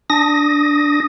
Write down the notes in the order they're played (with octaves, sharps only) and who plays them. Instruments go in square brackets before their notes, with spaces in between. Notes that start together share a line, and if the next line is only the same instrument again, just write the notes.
[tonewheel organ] D4 D#6 A#6